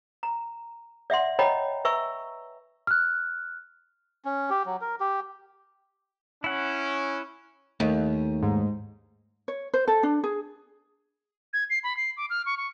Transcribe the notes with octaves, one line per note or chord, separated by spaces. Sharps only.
A#5
D5 E5 F#5 C6
C#5 D#5 G5 A#5 B5
B4 E5 G#5 A#5 C#6 E6
F6 F#6
C#4
G4
F#3
A#4
G4
C#4 E4 F#5
D#2 A3
G#2
C#5
C5
A4
D4
G#4
G#6
C7
B5
C7
D6
F6
C#6
C#6